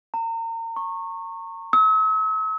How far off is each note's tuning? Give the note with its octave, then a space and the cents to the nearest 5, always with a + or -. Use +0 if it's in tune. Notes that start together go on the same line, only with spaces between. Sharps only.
A#5 -35
C#6 -20
E6 -45